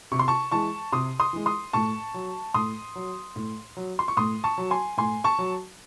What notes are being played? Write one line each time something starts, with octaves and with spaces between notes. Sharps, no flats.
C3 C#6
C6
A5 C#6
E3 G#3 A5 C#6
C3 C6 D#6
C6 D#6
E3 G#3
C6 D#6
A2 A5 C#6
F#3
A2 C6 D#6
F#3
A2
F#3
C6
C#6
A2 C6 D#6
A5 C#6
F#3
G#5 C6
A2 G#5 C6
A5 C#6
F#3